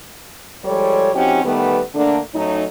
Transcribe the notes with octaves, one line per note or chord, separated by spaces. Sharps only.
F3 G3 G#3 A4 C#5
F3 C4 C#4 D#4 F#4 G4
D#3 G3 A3 B3
D3 A3 A#3 D4
A2 F#3 A3 C#4 D#4